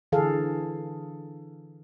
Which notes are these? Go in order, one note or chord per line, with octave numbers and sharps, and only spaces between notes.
D3 E3 G#4 A4 F5